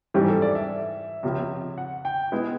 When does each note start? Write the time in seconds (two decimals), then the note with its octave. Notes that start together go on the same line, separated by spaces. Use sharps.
0.14 G#2 E3 G3 G4
0.28 A4
0.42 D5
0.55 E5
1.23 C#2 C3 F3
1.78 F#5
2.05 G5
2.32 G#3 B3 E4